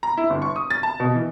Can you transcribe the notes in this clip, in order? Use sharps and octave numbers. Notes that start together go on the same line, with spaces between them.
A#5
E4
G1
C#6
D#6
A6
A5
B2
E3